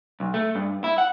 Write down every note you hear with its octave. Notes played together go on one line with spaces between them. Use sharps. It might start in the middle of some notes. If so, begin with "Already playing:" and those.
B1
A3
G2
E4
F#5